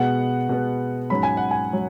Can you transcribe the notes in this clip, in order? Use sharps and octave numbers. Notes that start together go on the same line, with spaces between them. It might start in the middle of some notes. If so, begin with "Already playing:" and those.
Already playing: B2 G#3 B3 F#5
B2 G#3 B3
G#2 F#3 C#4 B5
G#5
F#5
G#5
F#3